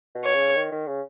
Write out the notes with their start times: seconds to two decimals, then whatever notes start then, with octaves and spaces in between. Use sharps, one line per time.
0.15 B2
0.25 C#5
0.35 C#3
0.56 D#3
0.72 D#3
0.87 C#3